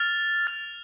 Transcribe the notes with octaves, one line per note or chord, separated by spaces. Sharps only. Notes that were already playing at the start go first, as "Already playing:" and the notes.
Already playing: F6 A6 F7
F6 A6 F7